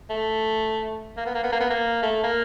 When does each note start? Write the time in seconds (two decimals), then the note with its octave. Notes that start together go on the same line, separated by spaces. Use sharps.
0.10 A3
1.17 A#3
1.26 B3
1.34 A#3
1.43 B3
1.52 A#3
1.61 B3
1.70 A#3
2.03 A3
2.24 A#3